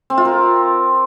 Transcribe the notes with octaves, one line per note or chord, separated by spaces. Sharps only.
C4
F4
A#4